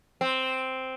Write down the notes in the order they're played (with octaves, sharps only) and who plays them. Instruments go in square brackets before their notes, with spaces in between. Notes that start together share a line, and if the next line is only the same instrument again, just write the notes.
[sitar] C4